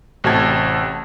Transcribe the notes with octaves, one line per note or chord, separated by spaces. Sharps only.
A1 C3 A3 F#4 A5 G#6